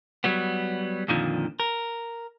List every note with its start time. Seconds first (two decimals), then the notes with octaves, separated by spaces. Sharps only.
0.24 F#3 G3 B3
1.08 F2 A#2 D3 D#3 F3
1.60 A#4